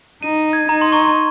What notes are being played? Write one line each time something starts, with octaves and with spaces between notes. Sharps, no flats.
D#4 D#7
G#6
D#4 A#5
C6
C#6
C6